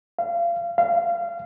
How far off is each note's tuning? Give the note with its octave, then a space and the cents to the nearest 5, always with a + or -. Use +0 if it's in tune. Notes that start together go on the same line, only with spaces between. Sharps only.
F5 -30
F5 -25